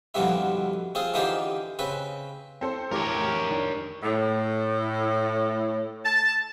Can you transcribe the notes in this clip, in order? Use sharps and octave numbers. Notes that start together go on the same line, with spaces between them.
F2 B2 D3 F3 G3 E4
C4 F4 G#4
D3 E3 D#4 F4 G4 C5
C#3 C4 B4
C4 A4 C5
A1 G4 A#4 C#5 D6
D#3 D4
A2
A5